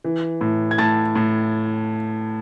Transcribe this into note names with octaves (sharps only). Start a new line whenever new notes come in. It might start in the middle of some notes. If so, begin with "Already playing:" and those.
E3
A2
G#6
A2 A5 A6
A2